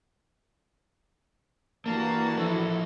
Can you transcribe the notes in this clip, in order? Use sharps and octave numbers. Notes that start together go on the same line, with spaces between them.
G2 E3 A#3 F#4 A5
F3 D4 E4 A4